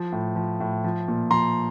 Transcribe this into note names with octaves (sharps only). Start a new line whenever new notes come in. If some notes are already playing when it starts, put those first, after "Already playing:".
Already playing: F3
A2
F3
A2
F3
A#2
F3 A#5 C6